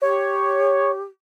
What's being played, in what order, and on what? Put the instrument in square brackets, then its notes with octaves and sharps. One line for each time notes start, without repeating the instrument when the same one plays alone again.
[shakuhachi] G4 [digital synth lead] C#5